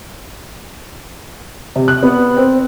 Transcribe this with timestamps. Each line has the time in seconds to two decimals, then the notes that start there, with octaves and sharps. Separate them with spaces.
1.76 C3
1.88 F#6
2.03 B3
2.37 C4